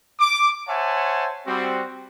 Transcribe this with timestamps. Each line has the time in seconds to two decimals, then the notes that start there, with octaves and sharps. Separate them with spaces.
0.20 D6
0.68 C5 C#5 E5 F#5 G#5 A5
1.46 G3 C4 F#4